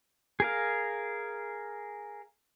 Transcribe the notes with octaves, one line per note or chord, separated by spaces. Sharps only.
G#4 A#4 F5